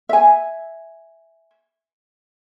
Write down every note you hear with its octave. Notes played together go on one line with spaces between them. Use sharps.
E5 G#5